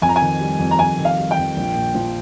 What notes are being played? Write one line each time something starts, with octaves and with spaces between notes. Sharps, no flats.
F2 G#5
A#5
G#5
D#3
G3
F2
A#5
F2 G#5
D#3
F5
G3
G5
F2
A#1
A#2
F3